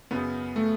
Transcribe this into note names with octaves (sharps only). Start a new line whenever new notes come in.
F#2 C#3 B3
A3